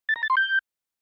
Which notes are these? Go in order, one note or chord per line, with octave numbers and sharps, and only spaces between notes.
A6
A#5
A6
C6
G6